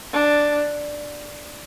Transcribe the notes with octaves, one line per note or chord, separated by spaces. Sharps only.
D4